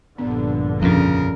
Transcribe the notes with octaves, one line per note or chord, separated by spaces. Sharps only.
A#1 G2 D3 B3
F2 A#2 C#3 F3 C#4 D4 A#4